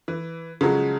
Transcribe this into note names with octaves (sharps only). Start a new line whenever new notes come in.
E3
C#3 F3 F#3 G#3